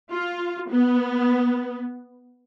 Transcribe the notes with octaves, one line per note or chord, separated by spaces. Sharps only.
F4
B3